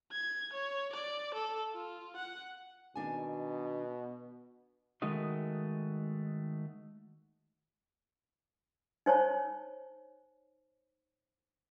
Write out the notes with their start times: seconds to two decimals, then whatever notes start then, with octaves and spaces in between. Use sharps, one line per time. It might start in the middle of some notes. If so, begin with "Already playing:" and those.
0.12 G#6
0.53 C#5
0.93 D5
1.34 A4
1.74 F4
2.16 F#5
2.95 B2 D#3 D4 G#5
5.02 D#3 G#3 A3 D#4 F#4 D#5
9.06 D#4 C5 C#5 A5